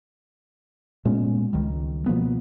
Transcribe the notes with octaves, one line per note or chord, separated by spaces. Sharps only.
A#2 G#3 B3 C#4
C#2 D#3 G3
B2 F3 A#3 B3